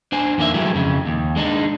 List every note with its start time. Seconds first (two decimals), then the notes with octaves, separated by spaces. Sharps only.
0.12 D4 C5 G#5
0.38 F2 D#3 A#3 F#4 E5
0.54 F#3 G#3 A3 E4 G4
0.74 F2 C#3
1.06 D#2
1.36 G#3 D4 D#4